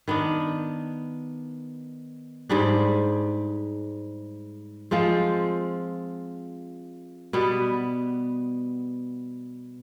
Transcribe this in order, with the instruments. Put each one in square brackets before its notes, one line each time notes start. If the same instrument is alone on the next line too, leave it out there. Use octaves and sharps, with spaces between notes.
[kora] D#3 B3 D4
G#2 G3 D4 G#4
F3 G#3 C4 F4
B2 G3 B3